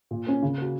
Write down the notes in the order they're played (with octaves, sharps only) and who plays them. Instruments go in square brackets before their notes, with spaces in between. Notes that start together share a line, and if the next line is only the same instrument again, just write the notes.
[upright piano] A#2
A#3 C#4
C#3
A#3 F#4